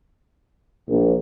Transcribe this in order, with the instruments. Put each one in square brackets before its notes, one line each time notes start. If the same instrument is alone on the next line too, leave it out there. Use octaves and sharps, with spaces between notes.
[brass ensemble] A#1